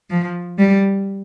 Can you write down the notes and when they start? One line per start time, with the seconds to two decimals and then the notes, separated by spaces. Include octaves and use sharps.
0.10 F3
0.59 G3